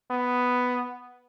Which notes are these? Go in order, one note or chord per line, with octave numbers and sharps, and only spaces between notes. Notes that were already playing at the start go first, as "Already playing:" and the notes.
B3